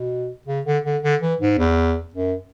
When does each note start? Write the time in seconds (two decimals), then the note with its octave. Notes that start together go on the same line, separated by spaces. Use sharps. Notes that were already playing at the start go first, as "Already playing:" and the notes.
Already playing: B2
0.47 C#3
0.65 D3
0.85 D3
1.03 D3
1.21 E3
1.40 G#2
1.58 E2
2.14 F#2